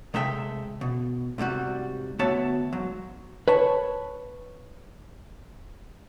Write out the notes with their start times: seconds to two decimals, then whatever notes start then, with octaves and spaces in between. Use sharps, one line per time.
0.14 C3 G#3 A4 E5 G5
0.81 B2
1.38 G#2 C3 G3 F#4
2.19 D2 B3 F#4 C#5 E5 A5
2.73 G#2 F#3
3.48 B4 C#5 A5